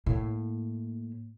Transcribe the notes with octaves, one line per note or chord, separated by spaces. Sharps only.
A2 A#3